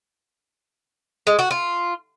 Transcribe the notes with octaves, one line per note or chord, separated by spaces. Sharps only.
G#3
F#4
F4